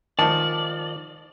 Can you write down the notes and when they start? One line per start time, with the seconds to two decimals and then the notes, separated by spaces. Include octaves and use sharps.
0.19 D#3 F3 D5 A5